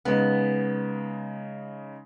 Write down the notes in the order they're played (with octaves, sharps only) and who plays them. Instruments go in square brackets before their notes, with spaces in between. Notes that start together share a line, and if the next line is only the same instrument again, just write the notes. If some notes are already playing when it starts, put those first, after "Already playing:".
[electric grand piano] C#3 G#3 D#4 [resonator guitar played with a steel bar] B3